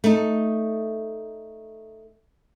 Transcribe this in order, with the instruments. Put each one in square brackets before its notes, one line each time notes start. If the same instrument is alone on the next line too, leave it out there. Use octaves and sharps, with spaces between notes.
[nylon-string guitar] A3 D#4